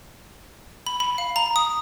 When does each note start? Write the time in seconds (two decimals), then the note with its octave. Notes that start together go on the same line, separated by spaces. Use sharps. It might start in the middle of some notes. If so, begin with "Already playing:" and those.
0.87 B5
1.00 B5
1.18 F5
1.36 A#5
1.56 D#6